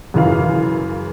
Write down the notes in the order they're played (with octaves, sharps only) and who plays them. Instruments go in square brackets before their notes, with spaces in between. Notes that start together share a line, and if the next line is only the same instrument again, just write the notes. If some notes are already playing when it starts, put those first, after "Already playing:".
[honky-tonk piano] F#2 C#3 E3 F5